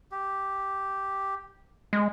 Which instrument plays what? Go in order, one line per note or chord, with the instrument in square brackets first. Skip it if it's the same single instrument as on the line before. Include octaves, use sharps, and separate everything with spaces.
[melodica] G4
[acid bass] G#3